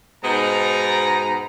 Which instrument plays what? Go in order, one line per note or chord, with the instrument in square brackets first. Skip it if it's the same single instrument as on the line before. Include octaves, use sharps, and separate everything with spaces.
[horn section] G#2 B2 B3 D#4 A#5